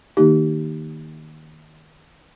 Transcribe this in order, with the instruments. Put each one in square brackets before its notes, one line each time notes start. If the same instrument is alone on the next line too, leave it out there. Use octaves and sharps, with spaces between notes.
[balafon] D#3 A#3 D#4 G4